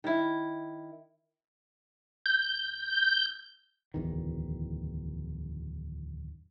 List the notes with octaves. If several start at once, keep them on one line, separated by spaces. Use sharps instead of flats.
D#3 E4
G6
D1 E2 D#3